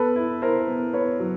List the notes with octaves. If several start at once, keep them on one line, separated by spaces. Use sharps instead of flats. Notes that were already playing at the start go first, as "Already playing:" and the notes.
Already playing: B3 A4 B4
E4
E4 A#4 C5
B3
B3 B4 C#5
F#3